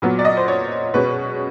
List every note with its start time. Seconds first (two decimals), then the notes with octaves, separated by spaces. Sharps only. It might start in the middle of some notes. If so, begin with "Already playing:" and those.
0.02 A#2 F#3 B3
0.19 D5
0.25 D#5
0.37 C5
0.48 C#5
0.94 B2 G#3 C#4 B4